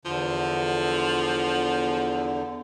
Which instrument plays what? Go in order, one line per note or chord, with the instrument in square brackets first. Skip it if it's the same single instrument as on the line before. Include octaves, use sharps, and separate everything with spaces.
[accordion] E2 D3 [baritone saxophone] F3